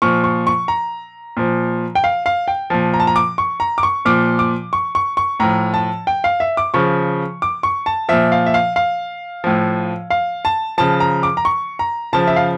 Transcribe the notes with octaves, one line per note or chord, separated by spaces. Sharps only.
A#2 F3 C#6
C#6
C#6
A#5
A#2 F3
G5
F5
F5
G5
A#2 F3 A5
A#5
A5
A#5
D6
C#6
A#5
D6
C#6
A#2 F3 D6
D6
C#6
C#6
C#6
A2 F3 A#5
A5
G5
F5
E5
D6
C#3 F3 C#6
D6
C#6
A5
A#2 F3 E5
F5
E5
F5
F5
A2 F3
F5
A5
C#3 F3 A5
A#5
D6
A#5
C#6
A#5
C#3 F3 A5
E5
F5